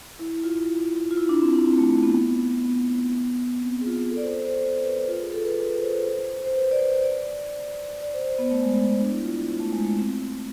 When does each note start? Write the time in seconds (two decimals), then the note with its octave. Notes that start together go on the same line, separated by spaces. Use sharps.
0.19 E4
0.44 F4
1.11 F4
1.17 E4
1.29 D4
1.42 C4
1.54 D4
1.66 C4
1.78 A3
1.90 A3
2.03 B3
2.64 B3
3.61 C4
3.81 G#4
3.86 F4
4.11 A4
4.17 D5
4.22 C5
4.35 D5
4.47 C5
4.84 B4
5.08 F4
5.21 G#4
5.32 A4
5.45 B4
5.81 C5
6.44 C5
6.55 B4
6.71 D5
6.79 C5
7.04 D5
8.02 D5
8.13 C5
8.38 B3
8.51 A3
8.62 G#3
8.74 A3
8.87 B3
8.99 D4
9.12 E4
9.24 F4
9.36 D4
9.60 A3
9.73 G#3
9.85 A3
9.97 C4